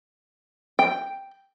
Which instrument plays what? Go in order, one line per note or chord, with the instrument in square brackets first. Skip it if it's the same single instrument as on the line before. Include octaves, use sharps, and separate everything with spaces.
[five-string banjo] G5